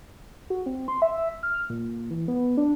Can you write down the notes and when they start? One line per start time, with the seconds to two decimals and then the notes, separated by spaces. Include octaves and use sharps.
0.50 F#4
0.66 C4
0.88 C6
1.02 E5
1.43 F6
1.70 A#2
2.11 E3
2.28 B3
2.57 D4